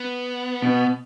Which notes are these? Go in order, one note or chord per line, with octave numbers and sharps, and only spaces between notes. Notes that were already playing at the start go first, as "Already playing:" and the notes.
Already playing: B3
B2